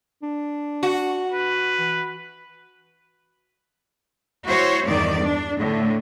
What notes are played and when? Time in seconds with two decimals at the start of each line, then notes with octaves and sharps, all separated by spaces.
0.23 D4
0.83 F#4
1.32 B4
1.79 E3
4.45 E4 F#4 C5 C#5
4.88 E2 G2 D#3 D5
5.24 D4
5.58 A2 D3